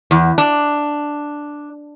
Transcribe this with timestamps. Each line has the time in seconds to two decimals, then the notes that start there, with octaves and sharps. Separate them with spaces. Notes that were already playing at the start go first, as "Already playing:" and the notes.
0.11 E2
0.38 D4